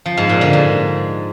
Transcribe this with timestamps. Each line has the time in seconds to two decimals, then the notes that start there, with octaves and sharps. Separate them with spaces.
0.06 F3
0.17 G#2
0.29 A#2
0.41 D3
0.53 G#2